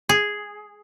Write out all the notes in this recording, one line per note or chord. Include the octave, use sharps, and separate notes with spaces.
G#4